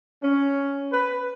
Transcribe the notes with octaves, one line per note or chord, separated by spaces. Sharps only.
C#4
B4